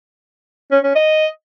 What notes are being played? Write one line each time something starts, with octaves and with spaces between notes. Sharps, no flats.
C#4
C#4
D#5